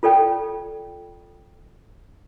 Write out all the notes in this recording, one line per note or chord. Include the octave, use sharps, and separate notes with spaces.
F4 A4 D5 G5